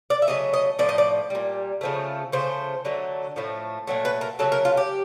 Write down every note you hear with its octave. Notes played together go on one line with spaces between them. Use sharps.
D5
E5
C#3 F#3 A3 D#5
D#5
A2 F3 A3 D5
D#5
D5
A#2 G3
C#3 F3 A3
C#3 F3 A3 C5
D3 F#3 A3
A2 F3 A3
A#2 F#3 A3
B4
A#4
C#3 F#3 A3 A4
A#4
F4
G4